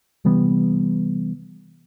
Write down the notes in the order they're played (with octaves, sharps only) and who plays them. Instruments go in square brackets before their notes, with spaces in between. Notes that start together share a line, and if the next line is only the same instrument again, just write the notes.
[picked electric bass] C3 E3 G3 B3